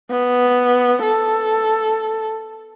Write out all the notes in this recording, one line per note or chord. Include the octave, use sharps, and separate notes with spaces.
B3
A4